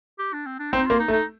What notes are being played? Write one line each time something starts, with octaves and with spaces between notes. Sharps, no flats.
G4
D4
C4
D4
C4 D#4
A#3 F4
D#4
A3
D#4